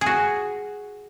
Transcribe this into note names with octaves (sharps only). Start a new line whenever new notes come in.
G#4
F#4